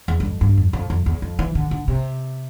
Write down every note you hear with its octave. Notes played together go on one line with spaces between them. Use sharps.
E2
G2
F2
G2
F2
F2
F2
E2
F2
E3
D3
D3
C3